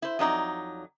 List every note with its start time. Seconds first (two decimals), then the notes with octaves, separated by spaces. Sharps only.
0.02 E4 C5
0.19 F2 F#3 D#4 D5